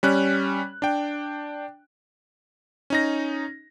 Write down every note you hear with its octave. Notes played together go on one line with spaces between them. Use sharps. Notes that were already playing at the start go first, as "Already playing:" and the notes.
G3 C#4 F#6
D4 G5
C#4 D#4 A#6